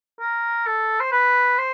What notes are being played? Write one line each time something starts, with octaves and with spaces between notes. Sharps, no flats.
A#4
A4
C5
B4
C5